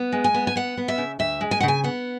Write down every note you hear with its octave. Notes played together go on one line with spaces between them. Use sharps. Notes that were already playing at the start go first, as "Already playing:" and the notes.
Already playing: B3
G#3
G#5
B3
G#5
B3 F#5
B3
E5
C#3
D2 E5
G#3
G#5
F#5
C#3 G#5
B3 F#5